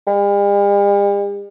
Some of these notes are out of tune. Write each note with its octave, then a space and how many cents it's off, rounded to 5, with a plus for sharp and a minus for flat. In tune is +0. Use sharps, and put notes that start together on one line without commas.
G3 +45